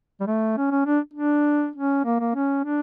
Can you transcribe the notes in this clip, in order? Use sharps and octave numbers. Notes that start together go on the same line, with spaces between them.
G3
A3
C#4
C#4
D4
D4
C#4
A#3
A#3
C#4
D4